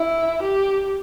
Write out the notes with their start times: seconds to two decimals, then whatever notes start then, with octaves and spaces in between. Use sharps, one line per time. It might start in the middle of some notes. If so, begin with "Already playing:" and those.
Already playing: E4
0.43 G4